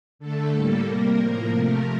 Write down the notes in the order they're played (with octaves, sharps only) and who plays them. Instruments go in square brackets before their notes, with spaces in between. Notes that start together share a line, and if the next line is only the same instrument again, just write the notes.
[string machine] D3 A3 A4
A2 G3 A#3
C3 G3 A#3 A#4
A2 F3 A#3 A#4
C3 F3 A3